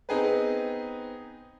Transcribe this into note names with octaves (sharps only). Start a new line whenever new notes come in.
B3 C4 D#4 G#4 B4